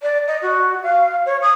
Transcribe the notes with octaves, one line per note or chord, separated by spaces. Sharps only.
D5
D#5
F#4
F5
C#5
D#6